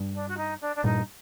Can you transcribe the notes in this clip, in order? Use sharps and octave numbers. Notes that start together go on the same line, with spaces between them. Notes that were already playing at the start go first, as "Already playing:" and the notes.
Already playing: G2
D4
F#4
D#4
D4
D4
G2 A#2 D#4